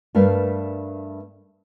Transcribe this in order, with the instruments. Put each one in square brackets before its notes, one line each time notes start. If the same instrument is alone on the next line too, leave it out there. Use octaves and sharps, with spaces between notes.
[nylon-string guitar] G2 A3 A#4 B4 F5